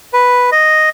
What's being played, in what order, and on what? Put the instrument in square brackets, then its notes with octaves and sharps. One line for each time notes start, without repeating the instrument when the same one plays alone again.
[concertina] B4
D#5